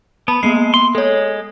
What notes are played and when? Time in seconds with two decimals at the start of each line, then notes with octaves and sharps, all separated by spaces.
0.28 B3 A5 B5
0.43 G#3 A#3 B3 C7
0.74 C6
0.95 G#3 A4 C#5